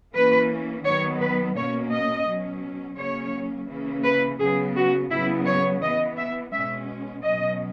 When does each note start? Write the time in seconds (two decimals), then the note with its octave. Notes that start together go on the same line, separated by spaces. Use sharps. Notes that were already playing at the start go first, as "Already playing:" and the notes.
0.14 E3 A#3 C#4 B4
0.84 D#3 F#3 B3 C#5
1.20 B4
1.55 B2 A#3 C#4 C#5
1.91 D#5
2.27 B2 F#3 C#4
2.97 C#3 F#3 A#3 C#4 C#5
3.68 C#3 E3 A#3 C#4
4.04 B4
4.39 C#3 F#3 B3 G#4
4.75 F#4
5.10 C#3 F#3 B3 E4
5.46 C#5
5.81 E3 B3 D#5
6.17 E5
6.52 B2 G#3 C#4 E5
7.23 B2 F#3 C#4 D#5